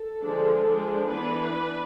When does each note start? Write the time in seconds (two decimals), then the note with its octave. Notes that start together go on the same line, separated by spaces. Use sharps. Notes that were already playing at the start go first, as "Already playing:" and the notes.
Already playing: A4
0.20 D3 F3 G#3 D4
0.66 F3 G#3 D4
1.10 E3 B3 D4 B4
1.55 D4